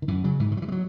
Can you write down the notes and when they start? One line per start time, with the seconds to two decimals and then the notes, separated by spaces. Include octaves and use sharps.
0.02 D#3
0.08 F#2 E3
0.24 C#3 F#3
0.40 G#2 E3
0.51 D#3
0.57 F#3
0.62 E3
0.68 G#3
0.72 F#3